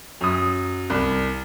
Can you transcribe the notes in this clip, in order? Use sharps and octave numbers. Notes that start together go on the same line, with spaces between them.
F#2 D#6
C2